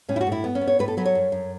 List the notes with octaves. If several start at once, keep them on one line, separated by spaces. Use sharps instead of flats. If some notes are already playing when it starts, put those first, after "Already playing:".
A2 C#4
E4
F#4
A2
E4
B3
C#4
B3
C#5
A2 B4
A4
F#3 B4
C#5
F#2
F#2